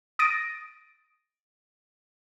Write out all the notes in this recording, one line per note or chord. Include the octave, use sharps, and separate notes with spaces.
D#6 A6 A#6 D7 D#7